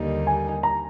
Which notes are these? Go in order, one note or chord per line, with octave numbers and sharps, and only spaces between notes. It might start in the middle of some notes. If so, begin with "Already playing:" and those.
Already playing: D#2 D3 G3 A#3 D#4
G#5
A#5